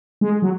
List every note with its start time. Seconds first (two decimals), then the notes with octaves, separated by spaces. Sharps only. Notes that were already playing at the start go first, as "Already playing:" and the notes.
0.21 G#3
0.42 F#3